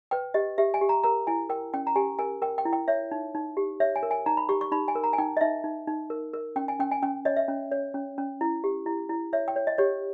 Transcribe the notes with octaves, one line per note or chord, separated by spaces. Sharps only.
B4 G5
G4 D#5
G4 E5
G#5
G4
A#5
A#4 A#5
E4 G#5
A#4 G5
C#4 G5
A#5
G4 G#5
A#4 G#5
A#4 G5
G5
E4
G5
C#5 E5
D#4
D#4
G4
C#5 E5
G#5
A#4
G#5
D#4 A#5
B5
G4 C#6
C#6
D#4 B5
G#5
A#4
A#5
G#5
D#4 G5
D#5
D#4 E5
D#4
D#4
A#4
A#4
C#4 G5
G#5
C#4 G5
G#5
C#4 G5
C#5 D#5
E5
C#4
C#5
C#4
C#4
E4
G4
E4
E4
C#5 E5
G5
C#5
D#5
G4 C#5